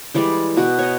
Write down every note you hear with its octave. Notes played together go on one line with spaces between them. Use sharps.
E3 G3 G#3 D5
B2 F#4 F#5
C#5 D#5